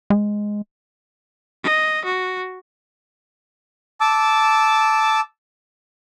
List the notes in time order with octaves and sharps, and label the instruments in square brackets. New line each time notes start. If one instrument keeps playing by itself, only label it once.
[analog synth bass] G#3
[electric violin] D#5
F#4
[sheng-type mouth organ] A5 D6 E6